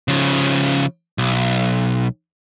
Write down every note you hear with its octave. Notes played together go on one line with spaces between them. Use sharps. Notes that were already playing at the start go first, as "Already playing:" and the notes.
C#3 F3
B1